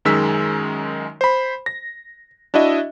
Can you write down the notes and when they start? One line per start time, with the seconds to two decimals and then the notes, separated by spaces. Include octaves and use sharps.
0.05 F#2 D#3 G#3 E6 B6
1.21 C5 B5
1.66 A#6
2.54 D4 E4 F#4 D#5 E5